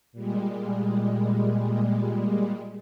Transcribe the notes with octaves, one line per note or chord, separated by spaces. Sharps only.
A#2 G3 G#3